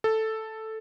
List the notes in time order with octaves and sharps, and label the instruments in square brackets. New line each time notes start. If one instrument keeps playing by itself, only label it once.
[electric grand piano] A4